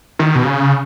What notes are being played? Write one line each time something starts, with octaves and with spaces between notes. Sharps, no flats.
D#3
B2
C#3